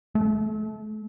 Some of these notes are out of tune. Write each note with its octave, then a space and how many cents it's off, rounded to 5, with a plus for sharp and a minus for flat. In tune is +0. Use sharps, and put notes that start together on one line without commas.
A3 -35